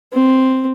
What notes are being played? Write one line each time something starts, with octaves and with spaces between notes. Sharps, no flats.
C4